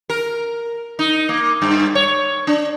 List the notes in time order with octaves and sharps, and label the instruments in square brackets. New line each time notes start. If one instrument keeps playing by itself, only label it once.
[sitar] A#4
D#4
A#3
G2
C#5
D4